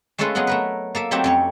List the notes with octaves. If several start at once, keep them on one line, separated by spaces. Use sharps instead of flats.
G#3 A3 C#4 F4 A4 B4
F#3 G#3 B3 D#5 F#5
A3 A#4 B4
A#3 A4 E5
F#3 A3 C4 D#4 G4 E5
F2 C#4 C#5